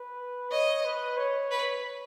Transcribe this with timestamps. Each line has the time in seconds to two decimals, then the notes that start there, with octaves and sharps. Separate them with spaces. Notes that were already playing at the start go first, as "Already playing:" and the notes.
Already playing: B4
0.51 C#5 D#5
0.85 B4
1.17 C#5
1.51 B4